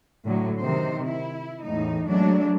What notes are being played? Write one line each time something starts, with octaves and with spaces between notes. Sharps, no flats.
A2 D3 F#3
C3 D#3 C5
E4
E2 A2 D#4
F#3 G#3 A3 D4